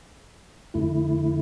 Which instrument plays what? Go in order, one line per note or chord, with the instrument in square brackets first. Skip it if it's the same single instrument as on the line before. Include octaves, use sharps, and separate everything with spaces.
[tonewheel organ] F2 D3 A3 E4